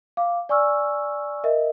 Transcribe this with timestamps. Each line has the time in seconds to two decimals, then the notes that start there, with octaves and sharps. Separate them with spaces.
0.17 F5 D6
0.49 D5 G#5 C#6 E6 F6
1.44 A#4 D#5 E5